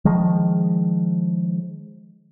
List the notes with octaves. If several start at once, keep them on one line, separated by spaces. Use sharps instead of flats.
D#3 F3 G#3